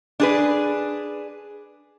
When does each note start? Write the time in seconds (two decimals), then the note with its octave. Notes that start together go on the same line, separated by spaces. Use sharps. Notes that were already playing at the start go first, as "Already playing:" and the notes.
0.20 D4 G#4 B4